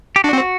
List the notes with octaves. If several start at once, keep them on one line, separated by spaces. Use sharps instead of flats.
G4
D4 F#4
C4